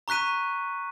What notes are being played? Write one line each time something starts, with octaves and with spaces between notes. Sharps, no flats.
A#5 C#6 F#6 B6 D#7